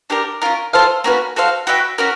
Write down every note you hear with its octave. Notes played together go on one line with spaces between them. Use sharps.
D4 G4 A#4
C#4 F4 A#4
F4 A4 C5 F5
A#3 C#4 F#4 B4
F#4 A4 C5 F5
F#4 B4 E5 G5
C#4 F#4 A#4